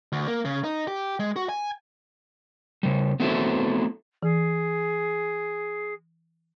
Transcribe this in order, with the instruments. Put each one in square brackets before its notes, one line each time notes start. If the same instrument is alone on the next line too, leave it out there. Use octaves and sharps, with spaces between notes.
[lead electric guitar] D2
A#3
C#3
D#4
G4
G#3
F#4
G#5
[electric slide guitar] C#3 G3
A3 B3 C4 E4 F#4 A4
[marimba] E3 [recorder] G#4